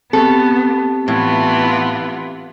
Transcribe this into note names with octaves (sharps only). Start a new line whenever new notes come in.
B3 C4 G4 A4
A2 E3 B3 F4